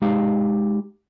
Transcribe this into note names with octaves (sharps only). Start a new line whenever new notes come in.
G#3 D#4 G4 F5